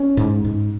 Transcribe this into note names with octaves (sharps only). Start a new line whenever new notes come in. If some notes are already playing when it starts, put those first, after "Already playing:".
Already playing: C#4
G#2
G#2